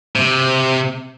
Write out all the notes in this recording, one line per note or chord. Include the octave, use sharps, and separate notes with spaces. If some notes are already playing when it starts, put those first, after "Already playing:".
C3